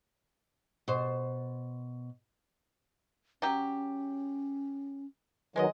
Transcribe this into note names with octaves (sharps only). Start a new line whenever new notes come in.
B2 C5
F#3 C#4 G4
D#3 F#3 G#3 B4 C#5 D#5